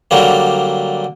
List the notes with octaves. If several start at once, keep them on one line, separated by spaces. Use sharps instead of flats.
D3 F#3 G3 A#3